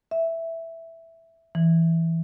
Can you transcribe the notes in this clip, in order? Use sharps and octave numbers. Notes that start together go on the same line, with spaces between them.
E5
E3